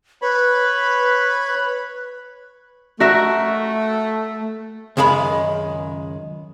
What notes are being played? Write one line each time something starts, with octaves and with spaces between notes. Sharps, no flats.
B4 C#5 B5
A3 F#4 A#4 E5
C#2 F#2 D#3 G#3 B5